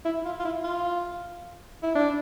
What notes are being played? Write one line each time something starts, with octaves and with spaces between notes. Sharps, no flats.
E4
F4
F4
E4
F4
E4
D4